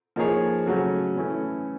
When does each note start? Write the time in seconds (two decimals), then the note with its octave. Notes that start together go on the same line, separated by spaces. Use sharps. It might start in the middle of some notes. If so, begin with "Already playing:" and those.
0.16 F3 A#3 D#4 G#4 C#5
0.66 C#3 F#3 A3 C#4
1.16 E3 A3 C#4 E4